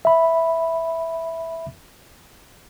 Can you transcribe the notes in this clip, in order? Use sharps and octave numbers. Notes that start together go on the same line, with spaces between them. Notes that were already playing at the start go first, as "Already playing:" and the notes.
E5 B5